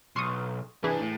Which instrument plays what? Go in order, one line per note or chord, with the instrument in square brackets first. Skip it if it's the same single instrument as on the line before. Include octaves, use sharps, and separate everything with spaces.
[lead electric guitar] B1 [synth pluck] C6 C#6 D#6
[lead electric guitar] C3 D4 [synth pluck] E3 G#4 B4
[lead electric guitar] A2